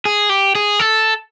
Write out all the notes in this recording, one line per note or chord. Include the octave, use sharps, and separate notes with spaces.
G#4
G4
G#4
A4